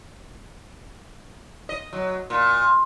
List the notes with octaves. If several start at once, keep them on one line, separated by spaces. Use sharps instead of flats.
D#5
F#3
A#2